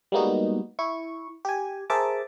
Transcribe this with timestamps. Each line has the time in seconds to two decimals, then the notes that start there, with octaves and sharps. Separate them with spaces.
0.12 G3 G#3 A#3 B3 D#4 F#4
0.79 E4 C#6
1.45 G4 G#5
1.90 G#4 A#4 C5 E5 A5 D6